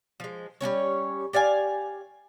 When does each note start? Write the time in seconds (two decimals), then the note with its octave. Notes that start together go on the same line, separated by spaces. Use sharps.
0.20 F3 G#3
0.61 G3 A#3 C#4 C#5
1.33 G4 D5 F5 G#5